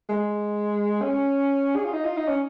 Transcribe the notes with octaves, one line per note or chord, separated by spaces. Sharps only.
G#3
C#4
G#4
F4
D#4
F4
D#4
C#4